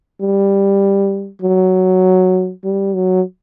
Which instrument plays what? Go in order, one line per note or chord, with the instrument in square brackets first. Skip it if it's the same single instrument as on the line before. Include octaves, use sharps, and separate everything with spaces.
[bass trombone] G3
F#3
G3
F#3